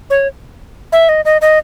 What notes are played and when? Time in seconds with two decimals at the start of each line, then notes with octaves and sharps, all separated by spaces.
0.10 C#5
0.92 E5
1.09 D#5
1.25 D#5
1.41 D#5